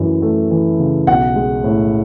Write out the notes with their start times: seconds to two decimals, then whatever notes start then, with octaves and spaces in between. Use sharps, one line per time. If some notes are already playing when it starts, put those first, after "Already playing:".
Already playing: F#2 E3 A3
0.22 A3
0.51 E3
0.79 C#3
1.07 B1 F#5
1.36 G#3
1.64 A2